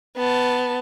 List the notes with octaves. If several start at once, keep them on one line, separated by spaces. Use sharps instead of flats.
B3 A5